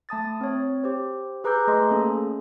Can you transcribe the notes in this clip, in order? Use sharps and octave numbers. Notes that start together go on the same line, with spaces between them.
A3 A5 D#6 A6
C4 C#5
G4 C5
G#4 B4 A#5 D6 E6 G6
A3 G#4 D#5 A#5 C6
A3 A#3 C#4 G#4 A4